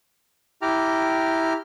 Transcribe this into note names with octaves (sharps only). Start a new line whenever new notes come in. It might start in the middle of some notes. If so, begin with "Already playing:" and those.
E4 G4 G5 A#5 D6 F6